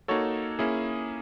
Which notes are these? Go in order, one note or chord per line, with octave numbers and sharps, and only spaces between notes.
A#3 D#4 F#4 A4 C#5
A#3 C#4 E4 G#4